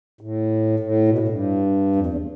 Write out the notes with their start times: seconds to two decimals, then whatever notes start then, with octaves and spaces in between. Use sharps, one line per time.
0.21 A2
0.79 A2
1.08 B2
1.18 A2
1.28 G2
1.96 F2
2.07 E2